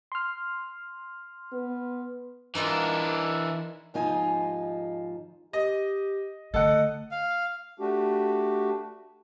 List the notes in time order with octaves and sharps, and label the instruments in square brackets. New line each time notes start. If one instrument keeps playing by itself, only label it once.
[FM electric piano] C6 F6
[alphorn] B3
[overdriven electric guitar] E3 D4 [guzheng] D#4 F4 A#4
[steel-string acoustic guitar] D#2 G#2 F3 D#4 F4 G#5
[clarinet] G4 [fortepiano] D#5
[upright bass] D3 A3 [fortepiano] A4 F#5 [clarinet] D#5
[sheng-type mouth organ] F5
[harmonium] A3 D4 F#4 G4